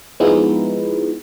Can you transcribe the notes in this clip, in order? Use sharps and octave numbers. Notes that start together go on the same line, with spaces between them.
F3 G#3 B3 D#4 E4